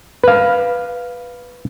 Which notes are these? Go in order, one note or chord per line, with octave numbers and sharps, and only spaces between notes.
B4 F5